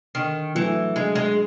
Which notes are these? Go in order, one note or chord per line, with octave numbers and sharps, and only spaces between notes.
D3 D#3
E3 F#3 A3
D3 G#3
G#3